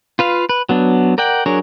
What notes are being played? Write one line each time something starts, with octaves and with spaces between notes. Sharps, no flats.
F4 B4 F5
B4
F#3 B3 D4
A#4 D5 F#5 G5
F#3 D4 G#4 A#4 C#5